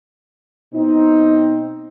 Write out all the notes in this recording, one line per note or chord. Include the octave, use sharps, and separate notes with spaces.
B2 C4 D#4